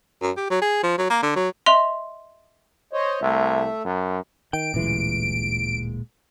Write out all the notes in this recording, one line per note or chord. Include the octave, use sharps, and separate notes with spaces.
F#2
G4
F#3
G#4
F3
F#3
A#3
D3
F#3
D#5 E5 C6 F7
C5 C#5 D#5
C2 A3 E5
F#2
D#3 G5 D7
D1 A1 A#2 E3 G#3